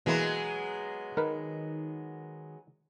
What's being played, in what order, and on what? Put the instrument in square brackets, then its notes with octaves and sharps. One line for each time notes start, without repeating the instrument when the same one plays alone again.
[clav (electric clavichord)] B2 E3 A#3 [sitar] F#3 G#3 B3
[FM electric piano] D#3 [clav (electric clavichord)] A#4 B4